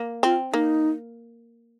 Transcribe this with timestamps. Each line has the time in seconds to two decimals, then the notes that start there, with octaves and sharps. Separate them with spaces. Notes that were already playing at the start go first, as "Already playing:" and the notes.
Already playing: A#3
0.23 C4 F4
0.53 A#3 D#4